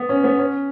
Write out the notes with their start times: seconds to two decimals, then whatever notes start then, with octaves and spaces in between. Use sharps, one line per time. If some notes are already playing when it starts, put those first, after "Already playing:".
Already playing: B3
0.09 C#4
0.24 B3
0.39 C#4